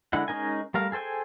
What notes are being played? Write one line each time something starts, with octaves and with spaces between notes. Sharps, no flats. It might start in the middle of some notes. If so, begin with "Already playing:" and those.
D3 G#3 D4 E4 F#5
G#3 C#4 D#4 A#4 G#5
G3 A3 A#4 F5
G#4 A4 C5 G5 G#5